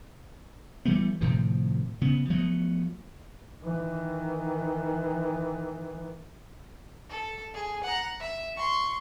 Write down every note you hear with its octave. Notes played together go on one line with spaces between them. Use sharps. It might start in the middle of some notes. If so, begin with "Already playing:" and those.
E3 G3 A3 B3
A2 C3 D#3 F3
C#3 B3
F3 F#3 A3 B3
D#3 E3
A4
G#4
F#5 A#5
E5
C6 C#6